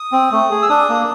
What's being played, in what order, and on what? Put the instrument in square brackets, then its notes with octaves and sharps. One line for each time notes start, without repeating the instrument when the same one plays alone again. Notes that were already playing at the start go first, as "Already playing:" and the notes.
Already playing: [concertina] D#6
C4
A3
G#4
E6
D4 D#6
A#3